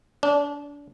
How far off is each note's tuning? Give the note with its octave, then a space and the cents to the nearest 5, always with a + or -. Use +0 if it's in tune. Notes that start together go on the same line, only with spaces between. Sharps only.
D4 -30